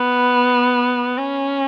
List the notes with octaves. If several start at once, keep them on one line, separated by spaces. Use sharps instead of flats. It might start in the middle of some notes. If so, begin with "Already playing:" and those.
Already playing: B3
C#4